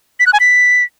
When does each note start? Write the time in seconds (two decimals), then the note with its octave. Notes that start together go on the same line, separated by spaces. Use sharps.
0.20 B6
0.26 F#6
0.33 G#5
0.40 B6